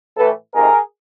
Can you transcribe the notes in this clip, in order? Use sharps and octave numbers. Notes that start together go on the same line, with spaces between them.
A2 E3 A3 A4 B4
F2 C3 D#3 G#4 A#4